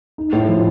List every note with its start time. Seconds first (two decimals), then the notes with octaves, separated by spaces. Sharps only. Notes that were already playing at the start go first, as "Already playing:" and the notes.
0.18 D#4
0.33 A2
0.49 F3